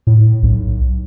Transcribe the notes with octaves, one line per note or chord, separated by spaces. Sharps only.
A2
B1